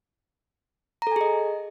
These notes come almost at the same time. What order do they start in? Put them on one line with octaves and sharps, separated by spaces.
A#5 A4 G#5 G#4 D#5